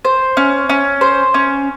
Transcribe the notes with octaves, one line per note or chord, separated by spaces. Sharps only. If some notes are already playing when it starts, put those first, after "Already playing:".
C5
C#4
C#4
C5
C#4